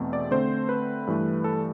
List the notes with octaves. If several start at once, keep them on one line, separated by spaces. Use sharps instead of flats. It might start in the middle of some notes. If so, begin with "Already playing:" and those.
Already playing: E2 B2 A3 C4
D5
D3 A3 C4 C5
B4
G2 E3 A3
A4